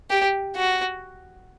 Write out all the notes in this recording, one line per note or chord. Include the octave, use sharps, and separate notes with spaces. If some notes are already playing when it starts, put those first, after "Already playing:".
G4
F#4